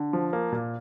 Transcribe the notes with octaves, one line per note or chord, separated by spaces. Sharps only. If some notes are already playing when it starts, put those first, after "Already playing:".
Already playing: D3
F3
A#3
A#2